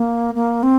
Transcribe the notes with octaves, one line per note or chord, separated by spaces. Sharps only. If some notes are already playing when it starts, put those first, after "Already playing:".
Already playing: A#3
A#3
C4